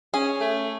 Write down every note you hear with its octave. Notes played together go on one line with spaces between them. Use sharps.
C#4 G#4
A3